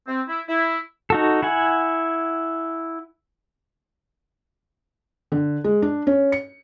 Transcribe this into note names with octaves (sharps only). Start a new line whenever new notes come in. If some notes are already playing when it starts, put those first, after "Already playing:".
C4
E4
E4
D#4 F#4 A4
E4 F#5 G#5
D3
G#3
D4
C#4
C#7